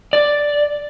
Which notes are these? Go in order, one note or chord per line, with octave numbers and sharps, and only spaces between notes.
D5